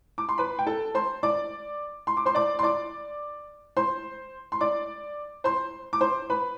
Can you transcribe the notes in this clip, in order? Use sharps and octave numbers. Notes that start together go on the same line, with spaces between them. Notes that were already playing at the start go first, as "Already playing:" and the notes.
D6
C6
B4 B5
G5
A4 A5
C5 C6
D5 D6
C6
D6
C5 C6
D5 D6
C6
D5 D6
C5 C6
C6
D5 D6
C5 C6
D6
C5 C6
B4 B5